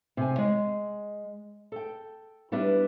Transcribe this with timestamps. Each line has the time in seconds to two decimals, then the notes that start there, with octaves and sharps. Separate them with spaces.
0.17 C3 G#5
0.38 G#3
1.72 A4 G5
2.52 G3 B3 D4 E4 B4